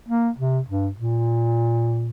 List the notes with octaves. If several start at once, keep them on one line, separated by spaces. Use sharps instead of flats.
A#3
C3
G2
A#2